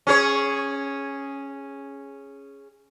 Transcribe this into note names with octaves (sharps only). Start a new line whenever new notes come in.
C#4 G#4 C#5